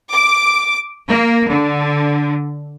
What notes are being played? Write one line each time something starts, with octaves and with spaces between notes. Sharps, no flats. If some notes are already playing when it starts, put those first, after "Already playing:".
D6
A#3
D3